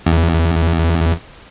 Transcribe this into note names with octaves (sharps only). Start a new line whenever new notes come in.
E2